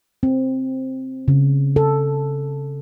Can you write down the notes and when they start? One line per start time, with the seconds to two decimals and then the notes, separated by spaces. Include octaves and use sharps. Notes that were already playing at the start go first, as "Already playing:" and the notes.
0.23 C4
1.28 C#3
1.76 A4